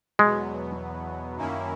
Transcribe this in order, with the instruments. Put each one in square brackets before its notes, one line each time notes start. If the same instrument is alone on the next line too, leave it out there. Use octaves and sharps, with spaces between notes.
[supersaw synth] E2 B2 F#3 B3 [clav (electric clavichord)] G#3
[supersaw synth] F#2 D#3 A#3 C#4 E4